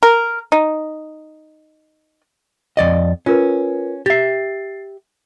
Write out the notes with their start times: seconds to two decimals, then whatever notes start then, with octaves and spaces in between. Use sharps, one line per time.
0.03 A#4
0.52 D#4
2.77 F2 D5 D#5
3.26 C#4 F4 A#4 B4
4.06 G4 E5 A6 C7